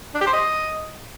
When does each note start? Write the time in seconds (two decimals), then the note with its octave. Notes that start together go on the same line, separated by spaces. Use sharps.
0.15 D4
0.21 G4
0.27 C5
0.33 D#5